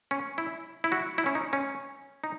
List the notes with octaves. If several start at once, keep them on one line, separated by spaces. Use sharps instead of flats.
C#4
E4
E4
F#4
E4
C#4
D#4
C#4
D#4